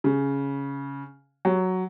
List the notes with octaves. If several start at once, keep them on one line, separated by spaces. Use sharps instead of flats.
C#3
F#3